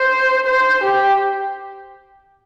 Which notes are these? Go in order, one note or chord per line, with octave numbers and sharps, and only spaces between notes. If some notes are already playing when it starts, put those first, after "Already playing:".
Already playing: C5
C5
G4